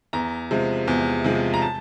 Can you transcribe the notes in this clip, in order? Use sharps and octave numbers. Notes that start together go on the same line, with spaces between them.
E2 A#5
C3 F3 G#3
E2
C3 F3 G#3
A#5
A5